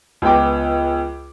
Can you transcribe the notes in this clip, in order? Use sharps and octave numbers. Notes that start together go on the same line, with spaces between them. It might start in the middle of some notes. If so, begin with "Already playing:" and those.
C#2 B3 G5 D6